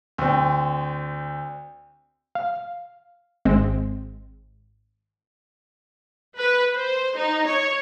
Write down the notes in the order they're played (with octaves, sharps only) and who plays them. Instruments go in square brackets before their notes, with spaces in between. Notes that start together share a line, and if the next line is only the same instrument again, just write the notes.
[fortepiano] D2 C4
[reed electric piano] F5
[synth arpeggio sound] G#1 G#3 C4
[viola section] B4
C5
D#4
C#5